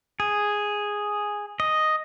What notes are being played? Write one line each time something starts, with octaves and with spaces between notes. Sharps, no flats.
G#4
D#5